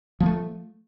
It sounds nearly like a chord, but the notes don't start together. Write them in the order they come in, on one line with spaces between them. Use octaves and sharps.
F3 A#3 A3